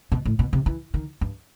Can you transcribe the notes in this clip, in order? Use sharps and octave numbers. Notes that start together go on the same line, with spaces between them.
B2
A2
B2
C3
E3
D#3
G2